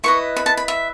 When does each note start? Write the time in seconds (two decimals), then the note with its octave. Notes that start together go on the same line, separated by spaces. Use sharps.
0.04 E4 B4 D#5 C#6
0.36 B5
0.46 A5
0.57 B5
0.68 E5